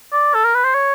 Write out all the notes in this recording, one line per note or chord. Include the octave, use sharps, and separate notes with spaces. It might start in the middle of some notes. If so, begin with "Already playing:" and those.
D5
A4
A#4
B4
C5
C#5